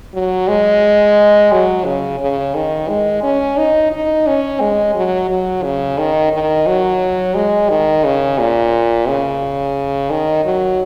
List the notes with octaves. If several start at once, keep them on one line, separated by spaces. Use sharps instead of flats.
F#3
G#3
F#3
C#3
C#3
D#3
G#3
C#4
D#4
D#4
C#4
G#3
F#3
F#3
C#3
D#3
D#3
F#3
G#3
D#3
C#3
A#2
C#3
D#3
F#3